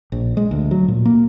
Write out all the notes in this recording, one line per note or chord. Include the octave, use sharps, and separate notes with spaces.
A#1
G#3
D2
F#3
A#2
A#3